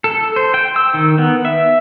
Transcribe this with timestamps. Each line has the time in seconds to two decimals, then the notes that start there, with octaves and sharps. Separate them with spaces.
0.04 A4
0.36 C5
0.54 G5
0.76 E6
0.94 D#3
1.18 B3
1.45 E5